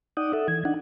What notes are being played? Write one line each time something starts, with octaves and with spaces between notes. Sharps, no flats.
D#4 D5 F#5 G5 D#6
A4 E5 F#5
E3 G#6
D4 D#4 F#5